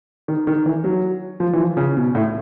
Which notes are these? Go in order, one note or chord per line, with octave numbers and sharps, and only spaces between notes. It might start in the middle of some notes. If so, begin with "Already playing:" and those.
D#3
D#3
E3
F#3
F3
E3
F3
C#3
B2
A2